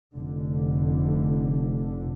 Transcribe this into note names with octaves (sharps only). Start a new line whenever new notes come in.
F1 D3